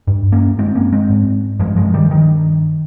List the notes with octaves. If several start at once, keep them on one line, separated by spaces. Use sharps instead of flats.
G2
A#3 C#4
G2 G#3 C4
A#3 C#4
G#3 C4
G#2
G2 F3 G#3
F3 G#3
D#3 G3
G2 D#3